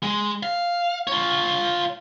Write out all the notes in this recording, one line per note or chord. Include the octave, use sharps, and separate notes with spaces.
G#3
F5
F4 C#5